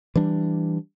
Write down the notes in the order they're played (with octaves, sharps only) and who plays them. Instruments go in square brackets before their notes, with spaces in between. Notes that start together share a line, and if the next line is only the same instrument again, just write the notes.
[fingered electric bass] E3 G3 D4